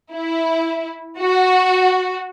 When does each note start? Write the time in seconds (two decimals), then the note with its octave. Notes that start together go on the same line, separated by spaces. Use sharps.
0.13 E4
1.18 F#4